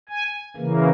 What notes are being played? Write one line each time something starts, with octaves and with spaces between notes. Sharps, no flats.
G#5
C#3 E3 A#3